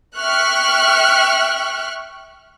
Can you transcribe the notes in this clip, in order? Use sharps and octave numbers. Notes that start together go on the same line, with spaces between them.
E5 G5 C#6 F6 F#6